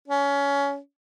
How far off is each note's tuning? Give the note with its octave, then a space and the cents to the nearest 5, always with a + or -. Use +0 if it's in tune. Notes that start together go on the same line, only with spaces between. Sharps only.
C#4 +20